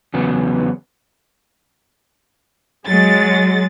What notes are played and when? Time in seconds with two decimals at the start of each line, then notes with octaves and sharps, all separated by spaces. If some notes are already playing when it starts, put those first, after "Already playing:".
0.14 E2 C#3 F#3 B3
2.87 F#3 G#3 A6